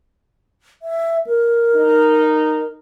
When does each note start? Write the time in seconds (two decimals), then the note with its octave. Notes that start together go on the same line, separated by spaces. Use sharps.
0.82 E5
1.26 A#4
1.75 D#4